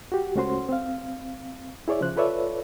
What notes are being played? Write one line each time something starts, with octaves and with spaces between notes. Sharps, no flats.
F#4 G4
C#2 A3 C#4 F#4 C5 C6
C4 F5
E4 G#4 C#5 D5 E5
C#3 F3 C5 F#6
F4 A4 B4 C#5 D5 E5